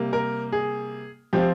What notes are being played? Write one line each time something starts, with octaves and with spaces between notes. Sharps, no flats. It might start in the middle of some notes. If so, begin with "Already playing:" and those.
Already playing: C3 G3 A#3
A#4
G#4
F3 C4 F4 G4